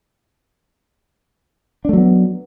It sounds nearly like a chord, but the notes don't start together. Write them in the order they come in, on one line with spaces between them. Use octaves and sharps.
D4 A3 F#3 B3